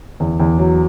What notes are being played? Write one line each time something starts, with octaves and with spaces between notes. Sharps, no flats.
E2
E2
F#3